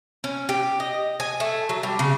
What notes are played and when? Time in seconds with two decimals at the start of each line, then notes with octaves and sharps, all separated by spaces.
0.24 C#4
0.49 G4
0.80 D#5
1.20 G#5
1.40 A3
1.69 F#3
1.83 G3
1.99 C#3